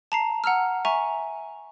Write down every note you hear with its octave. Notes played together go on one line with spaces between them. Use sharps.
A5 A#5 C7
F#5 A#5 E6 F6
E5 G#5 A#5 C#6